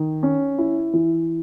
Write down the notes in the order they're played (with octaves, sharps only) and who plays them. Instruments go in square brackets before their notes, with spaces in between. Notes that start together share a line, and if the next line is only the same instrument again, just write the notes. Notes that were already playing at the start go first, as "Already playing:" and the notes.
Already playing: [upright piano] D#3
C#4
E4
E3